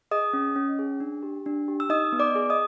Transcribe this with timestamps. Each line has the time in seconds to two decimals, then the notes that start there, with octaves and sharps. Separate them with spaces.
0.11 G#4 D#5 D#6
0.33 C#4
0.56 C#4
0.79 G#4
1.00 D4
1.23 G4
1.46 D4
1.68 G4
1.80 E6
1.89 D#4 D#5 D#6
2.12 B3
2.20 D5 D6
2.35 G#4
2.50 D#5 D#6